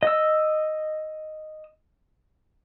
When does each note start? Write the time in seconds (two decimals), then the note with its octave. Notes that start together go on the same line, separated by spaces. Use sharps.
0.03 D#5 E6